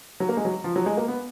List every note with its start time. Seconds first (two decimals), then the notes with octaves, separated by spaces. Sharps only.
0.20 F#3
0.29 A#3
0.37 G#3
0.45 F#3
0.64 F3
0.76 F#3
0.86 G#3
0.97 A#3
1.08 B3